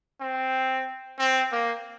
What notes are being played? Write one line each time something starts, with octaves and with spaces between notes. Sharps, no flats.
C4
C4
A#3